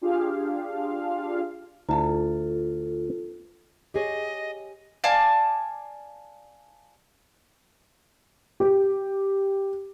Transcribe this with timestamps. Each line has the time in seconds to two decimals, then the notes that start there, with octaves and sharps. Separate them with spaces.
0.01 D4 F4 G4 G#4 F5
1.89 D2 E4 F4 A4 A5
3.94 G4 G#4 C#5 D#5
5.04 D5 F5 G#5 A5
8.60 G4